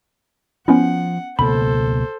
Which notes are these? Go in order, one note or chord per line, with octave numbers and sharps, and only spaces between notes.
F3 B3 C#4 E4 F#5
C#2 B2 A#3 A4 C5 B5